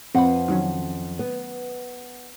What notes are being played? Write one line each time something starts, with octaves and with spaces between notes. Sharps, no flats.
F2 C4 B4 F#5
D#3 F#3 C#4
B3